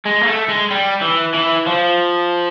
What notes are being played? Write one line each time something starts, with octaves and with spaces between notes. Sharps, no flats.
G#3
A#3
A3
G#3
G3
E3
E3
F3